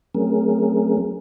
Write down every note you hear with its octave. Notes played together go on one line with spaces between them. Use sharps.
F#3 A3 C4 C#4 G#4 A#4